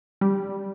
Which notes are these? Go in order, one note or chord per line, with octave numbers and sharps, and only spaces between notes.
G3